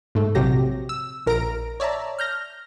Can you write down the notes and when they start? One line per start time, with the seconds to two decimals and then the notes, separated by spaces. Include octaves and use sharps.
0.15 G#2 A3
0.35 A#1 C3 F#3 G4 A#6
0.89 E6
1.26 A#1 A#4 A#5 A#6 D7
1.80 C#5 D5 E5 A5 A#5
2.19 F6 G6 A#6